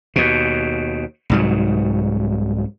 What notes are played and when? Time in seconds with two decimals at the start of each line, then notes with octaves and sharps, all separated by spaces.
0.16 D#2 B2
1.30 C2 G#2 F#3